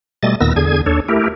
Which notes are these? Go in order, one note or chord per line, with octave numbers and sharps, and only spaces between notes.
B2 G3 A3 D#5 A6
D#2 A#2 D#3 B3 E6 A#6
E2 D3 G#4 G#6
D#2 D4 A4 C#5
A3 E4 G4 A#4